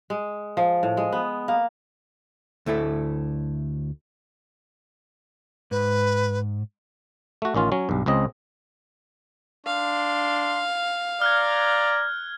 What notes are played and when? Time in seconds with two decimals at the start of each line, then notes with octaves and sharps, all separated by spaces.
0.10 G#3
0.57 F3
0.83 A2
0.97 G#3
1.12 B3
1.48 A#3
2.66 D2 A3 E4 A4
5.71 G#2 B4
7.42 A3 F#4
7.54 A1 D#3 C#4 F4
7.72 F#3 C#4
7.89 B1 G2
8.06 C#2 C#3 C4 D#5
9.66 D4 F5 C6
11.22 D5 A#5 F6 F#6 G#6